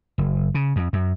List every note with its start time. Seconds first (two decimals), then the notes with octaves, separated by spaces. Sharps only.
0.18 F#1
0.55 C#3
0.76 F2
0.93 F#2